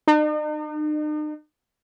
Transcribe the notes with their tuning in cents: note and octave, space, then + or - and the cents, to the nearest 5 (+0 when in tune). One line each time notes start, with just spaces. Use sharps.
D#4 -45